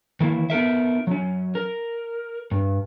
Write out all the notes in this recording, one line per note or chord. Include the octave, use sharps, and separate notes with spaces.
D#3 E3 A#3
B3 D#4 A#4 E5
F#3 C#4
A#4
G2